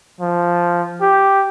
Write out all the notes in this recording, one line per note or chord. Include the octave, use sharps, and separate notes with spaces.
F3
G4